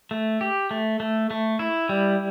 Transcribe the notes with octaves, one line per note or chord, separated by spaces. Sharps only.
A3
G4
A3
A3
A3
E4
G3